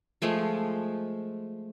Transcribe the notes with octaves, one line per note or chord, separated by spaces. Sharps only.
F3 G#3 A3 F4